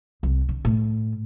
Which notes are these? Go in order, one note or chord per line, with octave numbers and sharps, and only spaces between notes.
C2
D3
A2